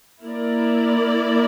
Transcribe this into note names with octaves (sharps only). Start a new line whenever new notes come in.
A#3 E4 A#4 D5